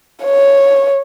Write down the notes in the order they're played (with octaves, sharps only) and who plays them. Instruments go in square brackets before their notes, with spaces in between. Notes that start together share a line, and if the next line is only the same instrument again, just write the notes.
[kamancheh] C#5